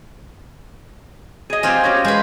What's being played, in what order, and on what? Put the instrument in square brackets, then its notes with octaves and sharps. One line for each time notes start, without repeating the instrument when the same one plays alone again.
[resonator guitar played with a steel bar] G#4 D#5
[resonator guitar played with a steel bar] F#3 C4 G4 [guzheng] F4 C5 D#5 [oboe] G#5
[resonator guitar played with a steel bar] C#4 F#4 G4 [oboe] C#5
[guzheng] G#3 B4 [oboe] C5